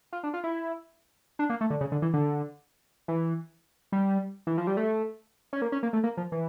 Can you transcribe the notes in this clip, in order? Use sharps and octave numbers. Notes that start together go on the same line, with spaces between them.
F4
D4
F4
E4
D4
A#3
A3
D3
C#3
D3
E3
D3
E3
G3
E3
F3
G3
A3
C#4
A#3
C#4
A#3
A3
A#3
F3
E3